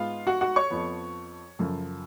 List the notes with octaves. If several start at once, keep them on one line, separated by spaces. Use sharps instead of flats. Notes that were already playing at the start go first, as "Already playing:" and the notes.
Already playing: G#2 G#3 B3 F4 F5
F#4 F#5
F#4 F#5
C#5 C#6
F2 F3 B3
F#2 C#3 F3 A3